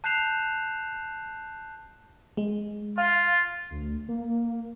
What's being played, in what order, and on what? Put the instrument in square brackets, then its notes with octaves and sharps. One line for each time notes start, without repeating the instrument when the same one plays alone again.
[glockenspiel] A5 F#6 G6 C7 E7 F7
[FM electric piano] G#3
[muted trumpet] F4 [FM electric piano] F5
[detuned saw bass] D2
A#3